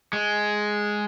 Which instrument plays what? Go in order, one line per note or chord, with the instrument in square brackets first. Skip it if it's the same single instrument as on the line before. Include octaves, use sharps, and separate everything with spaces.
[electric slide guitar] G#3